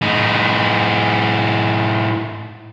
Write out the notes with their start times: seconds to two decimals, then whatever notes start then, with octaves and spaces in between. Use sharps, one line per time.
0.02 A2 D#4